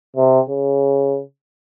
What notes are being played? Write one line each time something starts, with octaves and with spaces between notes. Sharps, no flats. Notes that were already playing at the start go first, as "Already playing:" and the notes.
C3
C#3